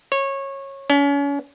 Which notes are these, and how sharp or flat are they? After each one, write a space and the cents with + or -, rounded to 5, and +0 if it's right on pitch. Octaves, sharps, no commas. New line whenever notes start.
C#5 -20
C#4 +35